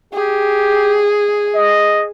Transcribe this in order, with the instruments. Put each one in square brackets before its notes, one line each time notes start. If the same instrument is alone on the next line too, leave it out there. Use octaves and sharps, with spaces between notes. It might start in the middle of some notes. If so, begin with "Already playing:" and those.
[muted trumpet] G4 [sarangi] G#4
[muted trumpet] D#5